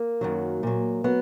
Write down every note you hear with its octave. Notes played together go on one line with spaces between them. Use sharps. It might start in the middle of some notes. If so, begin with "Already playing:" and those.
Already playing: A#3
F#2 D#3 F#3
A#2 F#3
F#3 B3